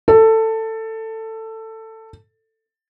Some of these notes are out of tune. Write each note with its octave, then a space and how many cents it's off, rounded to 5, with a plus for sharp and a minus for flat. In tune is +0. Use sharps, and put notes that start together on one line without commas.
A4 +15